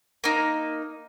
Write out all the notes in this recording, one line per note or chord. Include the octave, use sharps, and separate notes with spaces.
A#3 D#4